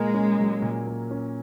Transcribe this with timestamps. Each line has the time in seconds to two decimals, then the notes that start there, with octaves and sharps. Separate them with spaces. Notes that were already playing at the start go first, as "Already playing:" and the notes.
Already playing: A#2 G#3 A#3
0.14 C#4
0.38 F#3
0.62 A#2
0.87 A#3
1.11 C#4